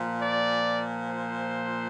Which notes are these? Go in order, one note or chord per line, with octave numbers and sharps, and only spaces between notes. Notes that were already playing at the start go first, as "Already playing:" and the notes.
Already playing: A#2 F3
D5
C5